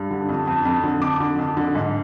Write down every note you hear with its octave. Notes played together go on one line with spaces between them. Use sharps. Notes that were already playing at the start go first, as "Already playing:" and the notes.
Already playing: G2
D3
F2
F2
F2
D3
F2 D6
D3
F2
D3
G#2